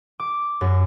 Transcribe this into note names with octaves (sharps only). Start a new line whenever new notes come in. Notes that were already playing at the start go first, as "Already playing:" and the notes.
D6
F#2